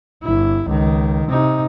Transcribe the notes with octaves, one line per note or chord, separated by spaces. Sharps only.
G1 E4
C#2 D#3
C3 D#4